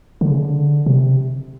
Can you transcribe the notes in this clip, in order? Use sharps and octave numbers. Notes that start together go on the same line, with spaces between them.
D3
C#3
D3
C3